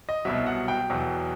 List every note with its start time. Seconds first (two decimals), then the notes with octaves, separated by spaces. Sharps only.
0.09 D#5
0.25 C2 B2 F#3 E5
0.46 F#5
0.68 G5
0.90 E2 B2 F#3